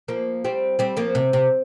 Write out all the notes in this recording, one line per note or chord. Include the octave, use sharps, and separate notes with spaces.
F3 A#3
G3 C4
G3 C4
F3 A#3
C3
C3